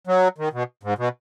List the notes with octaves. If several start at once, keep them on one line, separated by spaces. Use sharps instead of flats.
F#3
D#3
B2
G#2
B2